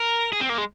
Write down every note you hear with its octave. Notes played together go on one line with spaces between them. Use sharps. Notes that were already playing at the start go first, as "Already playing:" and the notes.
Already playing: A#4
G#4
C4
A#3
G#3